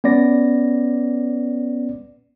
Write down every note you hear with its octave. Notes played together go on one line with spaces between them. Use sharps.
B3 C#4 D5 A#6